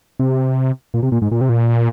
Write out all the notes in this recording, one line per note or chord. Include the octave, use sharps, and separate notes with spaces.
C3
A#2
C3
A#2
G#2
A#2
C3
A#2